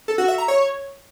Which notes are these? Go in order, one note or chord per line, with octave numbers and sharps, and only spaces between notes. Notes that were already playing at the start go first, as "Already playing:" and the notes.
A4
F#4
E5
A#5
C#5